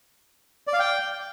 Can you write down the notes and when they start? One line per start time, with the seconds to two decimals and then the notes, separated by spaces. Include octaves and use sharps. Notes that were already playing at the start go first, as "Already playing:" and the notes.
0.67 D5
0.73 F5
0.79 G5